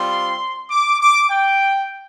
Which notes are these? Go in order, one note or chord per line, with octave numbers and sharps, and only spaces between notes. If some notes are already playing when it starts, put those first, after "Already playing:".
Already playing: G3 C4 F4 C6
D6
D6
G5